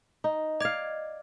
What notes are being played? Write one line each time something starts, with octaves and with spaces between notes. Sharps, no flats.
D#4
D5 D#5 F5 G#6